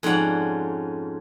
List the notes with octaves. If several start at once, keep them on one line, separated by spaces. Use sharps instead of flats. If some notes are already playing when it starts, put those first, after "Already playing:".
F2 G#2 C#4 D5 F#5